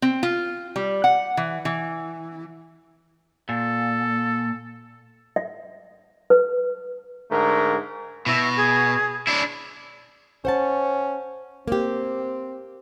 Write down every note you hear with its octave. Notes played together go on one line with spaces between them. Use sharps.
C4
F4
G3
F#5
E3
E3
A#2 A4
E5
B4
G#2 D3 A3 A#4
B2 E4
G#4
D4 E4
C#4 C5 F#5 A5
A#3 C4 G4